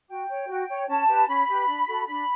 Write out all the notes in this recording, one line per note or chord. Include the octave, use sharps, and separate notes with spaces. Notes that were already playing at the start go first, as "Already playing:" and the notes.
F#4 G5
C#5
F#4
C#5
C#4 A5
G4 B4
C#4 B5
G4 B4
D4
F#4 A4
D4 B5